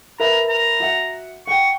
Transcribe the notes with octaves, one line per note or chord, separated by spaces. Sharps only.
A#4 B4 E5 A#5
A#5
F#4 E5 F#5
F#5 G5 C#6